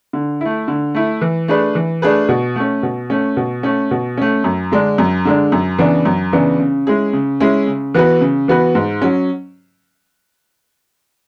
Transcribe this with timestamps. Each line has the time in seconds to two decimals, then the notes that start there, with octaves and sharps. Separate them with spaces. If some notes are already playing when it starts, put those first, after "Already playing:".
0.13 D3
0.41 A3 E4
0.68 D3
0.95 A3 E4
1.21 E3
1.48 A3 D4 G#4 B4
1.75 E3
2.02 A3 D4 G#4 B4
2.29 B2
2.56 A3 C#4
2.83 B2
3.10 A3 C#4
3.37 B2
3.63 A3 C#4
3.91 B2
4.18 A3 C#4
4.44 F#2
4.72 D3 G#3 D4
4.98 F#2
5.25 D3 G#3 D4
5.52 F#2
5.79 C#3 E3 B3 D4
6.05 F#2
6.33 C#3 E3 B3 D4
6.60 C#3
6.87 G#3 C#4 E4 G#4
7.13 C#3
7.40 G#3 C#4 E4 G#4
7.67 C#3
7.95 E3 B3 F#4 B4
8.21 C#3
8.48 E3 B3 F#4 B4
8.75 G#2
9.02 F#3 C#4